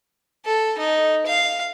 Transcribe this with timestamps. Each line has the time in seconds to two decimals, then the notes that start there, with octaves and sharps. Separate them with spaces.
0.45 A4
0.78 D#4
1.26 F5